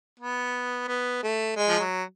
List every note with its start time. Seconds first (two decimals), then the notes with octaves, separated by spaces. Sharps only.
0.20 B3
0.88 B3
1.23 A3
1.56 G#3
1.68 F3
1.79 F#3